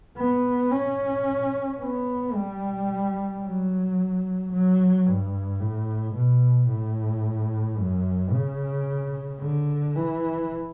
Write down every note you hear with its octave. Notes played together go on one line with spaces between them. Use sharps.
B3
C#4
B3
G3
F#3
F#3
G2
A2
B2
A2
F#2
C#3
D3
E3